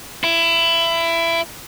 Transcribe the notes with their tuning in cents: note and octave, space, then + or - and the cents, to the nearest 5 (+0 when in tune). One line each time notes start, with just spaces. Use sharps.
E4 +20